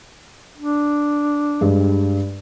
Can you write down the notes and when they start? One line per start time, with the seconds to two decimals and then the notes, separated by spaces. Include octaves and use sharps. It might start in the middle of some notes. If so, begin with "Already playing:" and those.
0.57 D4
1.61 G2 G#3